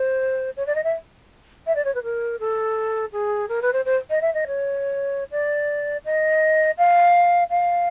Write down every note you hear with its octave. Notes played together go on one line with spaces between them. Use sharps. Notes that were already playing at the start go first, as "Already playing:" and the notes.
Already playing: C5
C#5
D5
D#5
E5
E5
D5
C#5
B4
A#4
A4
G#4
A#4
B4
C5
C5
D#5
E5
D#5
C#5
D5
D#5
F5
F5